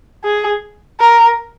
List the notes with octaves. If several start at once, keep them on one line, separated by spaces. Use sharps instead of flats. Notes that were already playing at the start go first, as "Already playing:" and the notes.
G#4
A#4